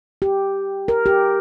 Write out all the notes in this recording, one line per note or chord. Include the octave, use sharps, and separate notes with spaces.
G4
A#4
G4